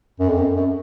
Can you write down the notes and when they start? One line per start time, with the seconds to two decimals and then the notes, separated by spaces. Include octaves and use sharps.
0.19 F#2
0.29 F2
0.38 F#2
0.56 F#2